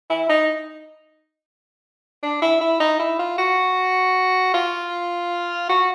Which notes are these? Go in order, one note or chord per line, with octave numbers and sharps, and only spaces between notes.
E4
D#4
D4
E4
E4
D#4
E4
F4
F#4
F4
F#4